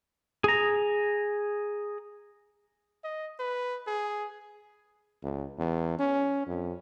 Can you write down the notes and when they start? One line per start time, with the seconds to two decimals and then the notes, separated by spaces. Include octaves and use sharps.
0.44 G#4 A#5
3.04 D#5
3.39 B4
3.87 G#4
5.23 C#2
5.58 E2
5.99 C#4
6.47 F2